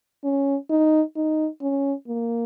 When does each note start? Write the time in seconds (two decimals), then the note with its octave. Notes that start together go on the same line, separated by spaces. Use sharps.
0.24 C#4
0.70 D#4
1.16 D#4
1.61 C#4
2.08 A#3